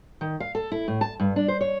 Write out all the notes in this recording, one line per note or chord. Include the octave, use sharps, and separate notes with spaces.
D#3
F5
A4
E4
A2
A5
G2
D4
C5
C#5